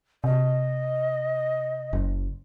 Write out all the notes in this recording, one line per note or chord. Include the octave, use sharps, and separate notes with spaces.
C3 D#5
F#1